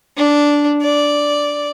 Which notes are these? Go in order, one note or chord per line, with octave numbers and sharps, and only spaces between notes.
D4
D5